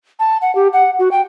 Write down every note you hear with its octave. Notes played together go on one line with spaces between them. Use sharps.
A5
F#5
G4
F#5
F#4
G5